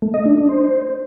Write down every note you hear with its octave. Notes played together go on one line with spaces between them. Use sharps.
A3
D#5
D4
D4
C5